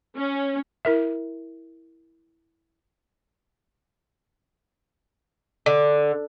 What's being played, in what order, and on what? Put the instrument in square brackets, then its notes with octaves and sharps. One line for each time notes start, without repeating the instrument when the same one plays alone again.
[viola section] C#4
[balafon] E4 A#4 E5
[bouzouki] D3